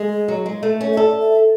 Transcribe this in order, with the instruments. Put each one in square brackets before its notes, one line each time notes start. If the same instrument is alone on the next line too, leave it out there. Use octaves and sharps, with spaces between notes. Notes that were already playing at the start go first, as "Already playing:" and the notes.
Already playing: [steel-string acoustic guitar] G#3 [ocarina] G#4
[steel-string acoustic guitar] F#3
G#3
A3
C#4
[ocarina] E5
[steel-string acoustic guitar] A4 [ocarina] D5
[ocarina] E5